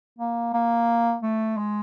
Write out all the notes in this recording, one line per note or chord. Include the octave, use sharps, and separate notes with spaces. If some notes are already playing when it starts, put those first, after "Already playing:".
A#3
A#3
A3
G#3